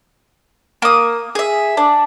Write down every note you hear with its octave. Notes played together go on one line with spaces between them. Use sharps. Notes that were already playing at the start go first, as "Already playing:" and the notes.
A#3 D#6
G#4 E5
D4